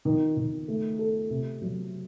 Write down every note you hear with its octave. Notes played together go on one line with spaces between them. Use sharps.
D#3
D#3
A3
A4
C3
F#3